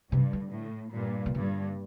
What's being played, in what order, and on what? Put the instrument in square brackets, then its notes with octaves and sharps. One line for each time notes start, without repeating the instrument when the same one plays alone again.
[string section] G2 [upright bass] C3
[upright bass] D3
[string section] A2
G2 A#2
[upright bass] C3
[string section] G2 [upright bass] D3